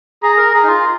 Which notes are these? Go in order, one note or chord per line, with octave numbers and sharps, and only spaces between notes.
G#4 A#5
A#4
G#4
D#4
F4